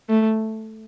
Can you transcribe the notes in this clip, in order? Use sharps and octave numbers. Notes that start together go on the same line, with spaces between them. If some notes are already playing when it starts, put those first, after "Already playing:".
A3